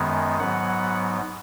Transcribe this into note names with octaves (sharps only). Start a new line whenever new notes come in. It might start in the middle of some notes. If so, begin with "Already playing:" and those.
Already playing: F#2 D#3 G#3 B3
G#2 F#3 B3 F#5